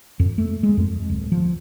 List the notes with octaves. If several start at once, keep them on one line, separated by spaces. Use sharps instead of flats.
F2
A3
G#3
F2
D1
F3